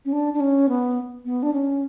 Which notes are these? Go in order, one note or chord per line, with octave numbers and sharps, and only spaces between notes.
C#4
D4
D4
C#4
B3
B3
D4
C#4